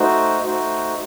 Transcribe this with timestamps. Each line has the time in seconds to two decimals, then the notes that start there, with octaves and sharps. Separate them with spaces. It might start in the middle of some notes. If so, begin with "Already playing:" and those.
Already playing: A3 D#4 F#4 C5
0.41 A3 D#4 F#4 C5